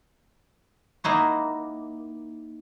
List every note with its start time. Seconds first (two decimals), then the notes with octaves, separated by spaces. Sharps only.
1.04 A#3 D#4 E4 F#4